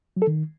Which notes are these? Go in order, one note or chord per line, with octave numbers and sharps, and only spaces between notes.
F#3
A4
D#3